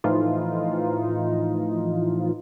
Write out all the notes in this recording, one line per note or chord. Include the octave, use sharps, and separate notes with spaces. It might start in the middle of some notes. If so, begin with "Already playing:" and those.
A2 E3 F3 D#4 F4